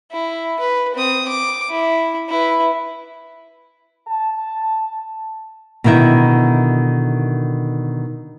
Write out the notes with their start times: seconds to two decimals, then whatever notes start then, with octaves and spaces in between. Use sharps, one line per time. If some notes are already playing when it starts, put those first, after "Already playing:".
0.12 E4
0.59 B4
0.95 C4 D#6
1.28 D6
1.70 E4
2.29 E4 B4
4.08 A5
5.84 B2 D3 D#3 E4 E5